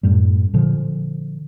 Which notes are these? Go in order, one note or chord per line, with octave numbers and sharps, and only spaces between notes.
F#2 A2 G3
A#2 D3 F3